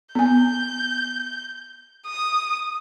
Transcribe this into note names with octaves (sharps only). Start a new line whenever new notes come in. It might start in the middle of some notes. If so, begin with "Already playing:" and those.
B3 G#5 G6
D#6